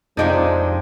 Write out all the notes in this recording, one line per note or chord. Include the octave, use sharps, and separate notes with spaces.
F2 C3 F3 G#3 D4 D#4 G4